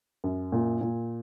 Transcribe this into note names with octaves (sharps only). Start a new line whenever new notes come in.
F#2
A#2
A#2